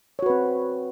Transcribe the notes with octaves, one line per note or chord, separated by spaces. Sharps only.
C4 F#4 B4 C#5